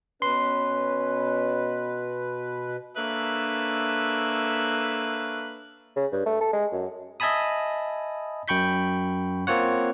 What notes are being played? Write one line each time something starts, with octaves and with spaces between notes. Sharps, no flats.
B2 C#4 B4 C6
A#3 D4 A4 B4 C#5 E5
C#3
G2
A3
A4
G#3
F#2
D#5 E5 G#5 A5 B5 D#6
F#2 G5 B5 C#6 G6 B6
A#3 C4 F4 C#5 F#5